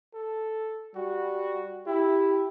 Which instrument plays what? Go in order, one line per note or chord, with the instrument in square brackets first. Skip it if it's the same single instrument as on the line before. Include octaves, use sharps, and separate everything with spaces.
[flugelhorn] A4
[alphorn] G3 [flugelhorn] F#4
[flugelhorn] E4 [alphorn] G4